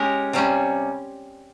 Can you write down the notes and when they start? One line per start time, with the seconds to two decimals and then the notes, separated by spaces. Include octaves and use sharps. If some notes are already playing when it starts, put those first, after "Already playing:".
Already playing: G#3 C#4 G4 A#4
0.33 C3 G3 C#4